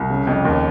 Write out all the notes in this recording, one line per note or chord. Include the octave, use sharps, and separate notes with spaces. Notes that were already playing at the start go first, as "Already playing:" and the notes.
Already playing: C2
C#3
F2
D#2